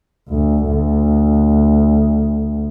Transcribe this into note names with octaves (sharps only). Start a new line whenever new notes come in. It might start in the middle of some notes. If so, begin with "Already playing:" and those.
D2
D2